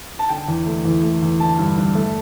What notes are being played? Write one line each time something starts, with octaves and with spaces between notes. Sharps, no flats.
A5
D3 G5
E2
A3
E2
A3
E2
D3 A5
G2
G2
A3